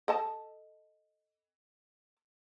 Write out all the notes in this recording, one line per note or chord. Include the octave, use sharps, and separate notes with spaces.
A4 D#5 A5